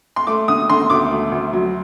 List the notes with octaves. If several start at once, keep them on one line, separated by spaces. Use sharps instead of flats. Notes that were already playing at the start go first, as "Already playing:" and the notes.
C6
A3 D6
D3 D#6
D3 C6
D2 D6
A3
D2
F#3